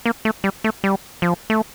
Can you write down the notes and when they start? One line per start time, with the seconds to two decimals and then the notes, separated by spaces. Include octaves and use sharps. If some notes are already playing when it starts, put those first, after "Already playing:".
0.06 A#3
0.25 A3
0.44 G3
0.64 A3
0.84 G3
1.22 F3
1.50 A3